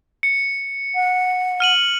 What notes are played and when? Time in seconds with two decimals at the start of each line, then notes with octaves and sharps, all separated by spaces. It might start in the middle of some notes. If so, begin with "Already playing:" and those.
0.23 C#7
0.95 F#5
1.60 F6 D#7 F#7